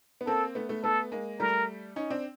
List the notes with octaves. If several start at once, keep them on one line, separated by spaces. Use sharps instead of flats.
B3
A#3 C4 A4
A3 B3
A3 B3
A3 B3 A4
G#3 A#3
G3 A3 A#4
C#4 D#4
C4 D4